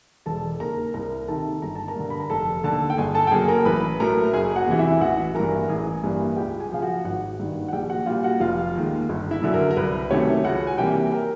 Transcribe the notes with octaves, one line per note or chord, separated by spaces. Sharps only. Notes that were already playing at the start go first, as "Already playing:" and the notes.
E1 A4 A5
D#2 C#3 A#4 A#5
C2 A#4 A#5
C3 D#3 A4 A5
G1 A#5
A5
A#4 A#5
G2 D3
B5
A#5
F1 A4 A5
D#2 D3 A4 A5
G5
G1 G#4 G#5
A4 A5
G5
F#2 C#3 F#3 A#3 G#4 G#5
A#4 A#5
A1 B4 B5
A2 F#3 A3 A#4 A#5
F#1 G#4 G#5
F#4 F#5
E2 C3 E3
E4 E5
A1 F#4 F#5
G2 E3 A#4 A#5
A1 G#4 G#5
G2 E3 G3 A#3
C#2 G4 G5
G#4 G#5
C#3 F3 F5
F#4 F#5
G#1 F#4 F#5
G2 D#3
F#5
A#1 G4 G5
F#4 F#5
A#2 G3 F4 F5
F#4 F#5
F1 F4 F5
D#2 D#3 G#3
G1
E4 E5
F#2 D3 F#3
A#4
A#4
C2 B4
C3 D#3 F#3 A3 C#4 C#5
C#2 F#4 F#5
G#5
C3 E3 G3 A#3 G4 G5
A#4 A#5